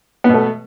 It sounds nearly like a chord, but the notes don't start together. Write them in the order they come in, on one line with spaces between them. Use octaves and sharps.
B3 B2 A3